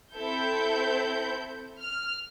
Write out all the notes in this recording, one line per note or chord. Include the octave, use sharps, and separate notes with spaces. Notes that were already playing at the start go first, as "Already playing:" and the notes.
C4 E4 A4 G6
F6